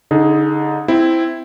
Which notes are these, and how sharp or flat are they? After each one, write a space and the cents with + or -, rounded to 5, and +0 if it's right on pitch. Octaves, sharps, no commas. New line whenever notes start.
D3 -20 D#4 +10 G#4 +0
C4 -5 E4 +0